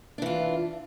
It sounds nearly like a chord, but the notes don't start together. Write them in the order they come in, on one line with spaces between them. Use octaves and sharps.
D4 E3 F4